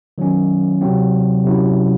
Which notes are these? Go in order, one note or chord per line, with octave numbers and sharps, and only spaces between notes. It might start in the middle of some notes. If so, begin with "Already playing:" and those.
D#3 F#3 C#4
C3 F#3 C4
C3 F#3 C#4 E4